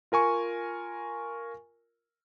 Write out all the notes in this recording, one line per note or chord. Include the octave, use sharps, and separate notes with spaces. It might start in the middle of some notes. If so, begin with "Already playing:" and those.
F4 A#4 G#5 C#6